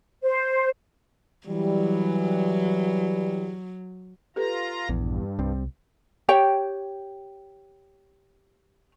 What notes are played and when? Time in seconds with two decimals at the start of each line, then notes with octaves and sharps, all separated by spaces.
0.23 C5
1.47 E3 F#3 G3
4.36 F4 G4 A4 B4 A#5
4.89 A#1 E2 G2
5.39 C2 G3 C4
6.29 G4 C#5 G5